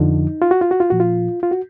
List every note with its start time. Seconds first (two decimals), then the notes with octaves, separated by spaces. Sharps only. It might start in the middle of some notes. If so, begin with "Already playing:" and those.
Already playing: F2 D3 F3 D#4
0.42 F4
0.51 F#4
0.61 F4
0.71 F#4
0.80 F4
0.90 A#2 F3 F#4
1.00 F4
1.43 F4
1.51 F#4